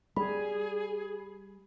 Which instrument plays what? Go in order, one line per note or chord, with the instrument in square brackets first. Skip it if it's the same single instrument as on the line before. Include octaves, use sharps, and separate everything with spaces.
[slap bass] G3 [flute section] G#4 [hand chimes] B5